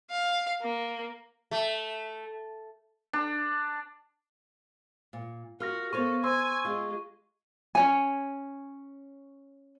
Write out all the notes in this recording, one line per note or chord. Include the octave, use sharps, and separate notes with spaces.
F5
A#3
A3
D4
A#2
F4 F#4 A#4 F6 A#6
B3 A4 C5 C#5 F5 C#6
C5 G#5 C6 E6
G#3 F4
C#4 C#5 G#5